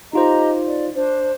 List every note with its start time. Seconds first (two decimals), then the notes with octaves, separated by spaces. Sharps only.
0.13 D#4 F4 G4 C5 D#5 A#5
0.65 D5
0.94 D4 C5